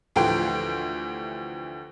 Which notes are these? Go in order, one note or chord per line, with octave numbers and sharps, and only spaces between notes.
D2 E3 F3 G4 G5 C6